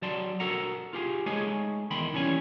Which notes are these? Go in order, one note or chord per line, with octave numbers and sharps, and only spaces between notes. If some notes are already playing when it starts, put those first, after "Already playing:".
F#3 D5 A5 C6
F#4 A4 A#4 F#5 A#5
F4 G4 G#4
G#3 A3 D#4 G#4 C#5 D#5
E2 D#3 G5 B5 C6
E3 G3 C#4 C#5 G#5